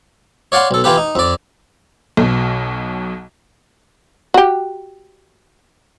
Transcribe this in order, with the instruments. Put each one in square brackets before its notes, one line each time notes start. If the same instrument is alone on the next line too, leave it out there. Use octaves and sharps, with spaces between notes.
[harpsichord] C#5 D5 F5 F#5 C6
B1 A4
E3 F4 G4 B4
D#4
F2 D5
[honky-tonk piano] B1 B2
[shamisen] F#4 G4